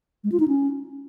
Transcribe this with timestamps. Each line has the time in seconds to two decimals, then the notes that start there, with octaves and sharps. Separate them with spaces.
0.24 G#3
0.32 F4
0.40 D#4
0.48 C#4